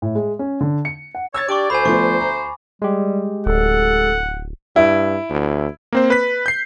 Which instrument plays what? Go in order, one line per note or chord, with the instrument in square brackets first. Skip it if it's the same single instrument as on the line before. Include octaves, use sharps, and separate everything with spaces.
[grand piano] A2
G#3
C#4
D3
C#7
F#5
[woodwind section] C#5 [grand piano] E6 G#6 A6
[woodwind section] D4 G4 D5 [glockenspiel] C#6 D6
[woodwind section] D2 C5 [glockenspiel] G#5 B5
[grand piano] F3 A3 B3 [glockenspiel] C#6
[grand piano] A#5
[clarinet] G3 [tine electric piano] G#3 G4
[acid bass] D1 [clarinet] A4 [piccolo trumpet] F#5
[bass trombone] G2 [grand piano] E4
[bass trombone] D2
[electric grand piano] A#3 C4 C5
B4 B6
G6 C7